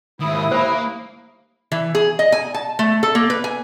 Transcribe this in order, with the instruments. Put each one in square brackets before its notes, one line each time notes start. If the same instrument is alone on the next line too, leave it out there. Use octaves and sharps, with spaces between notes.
[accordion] D#2 E4 [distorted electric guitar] G#2 D#3 [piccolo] D#6
[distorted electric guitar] A#3 [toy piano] C5 B5
[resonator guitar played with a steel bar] E3
G#4
D#5
G#5
A5
A3
A4
A#3
B4
G#5